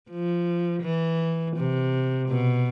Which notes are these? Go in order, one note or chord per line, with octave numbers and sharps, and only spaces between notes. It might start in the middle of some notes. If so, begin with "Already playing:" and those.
F3
E3
C3
B2